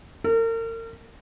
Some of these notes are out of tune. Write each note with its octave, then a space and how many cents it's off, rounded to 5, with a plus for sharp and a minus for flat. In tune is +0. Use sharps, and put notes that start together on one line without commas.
A#4 -40